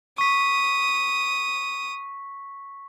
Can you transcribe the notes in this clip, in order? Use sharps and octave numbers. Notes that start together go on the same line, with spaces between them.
C#6 D#6 B6